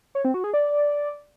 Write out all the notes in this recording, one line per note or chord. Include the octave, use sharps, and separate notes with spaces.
C#5
C4
F#4
G#4
D5